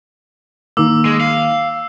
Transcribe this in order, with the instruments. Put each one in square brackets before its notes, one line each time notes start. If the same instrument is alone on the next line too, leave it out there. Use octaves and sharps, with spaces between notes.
[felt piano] D#3 A#3 [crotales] D6 E6
[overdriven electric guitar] G#3
F5